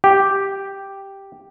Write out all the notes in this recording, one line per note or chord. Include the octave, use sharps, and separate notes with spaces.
G4